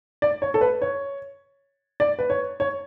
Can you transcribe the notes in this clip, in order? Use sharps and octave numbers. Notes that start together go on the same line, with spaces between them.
D5
C#5
A4
B4
C#5
D5
B4
C#5
C#5